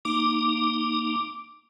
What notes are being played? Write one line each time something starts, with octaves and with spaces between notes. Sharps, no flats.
A#3 D#4 D6